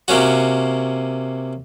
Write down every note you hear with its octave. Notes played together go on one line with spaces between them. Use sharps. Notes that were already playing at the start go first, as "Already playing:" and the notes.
C3 A#3 C#4 F#4